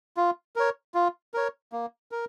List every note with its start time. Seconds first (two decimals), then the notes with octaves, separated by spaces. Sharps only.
0.17 F4
0.56 A#4 C#5
0.94 F4
1.34 A#4 C#5
1.73 A#3
2.12 A#4